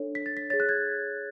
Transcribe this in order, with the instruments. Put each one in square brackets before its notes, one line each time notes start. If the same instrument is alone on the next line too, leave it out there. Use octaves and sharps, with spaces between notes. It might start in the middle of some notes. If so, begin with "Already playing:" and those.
Already playing: [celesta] D4 A4 C#5
B6
A6
B6
G#4 C#5 A6
F#6
G#6